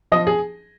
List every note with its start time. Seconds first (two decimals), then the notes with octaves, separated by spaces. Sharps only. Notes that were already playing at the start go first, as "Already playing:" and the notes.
0.12 F3 D#5
0.27 G#4